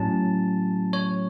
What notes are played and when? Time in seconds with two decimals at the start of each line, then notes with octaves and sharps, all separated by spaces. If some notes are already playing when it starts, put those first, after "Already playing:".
Already playing: A2 F#3 C#4 A5
0.93 C#5